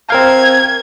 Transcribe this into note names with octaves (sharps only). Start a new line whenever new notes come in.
C4 A#4 F5 G#6